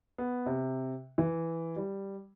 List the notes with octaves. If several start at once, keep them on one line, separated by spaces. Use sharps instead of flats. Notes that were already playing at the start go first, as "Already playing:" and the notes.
B3
C3
E3
G3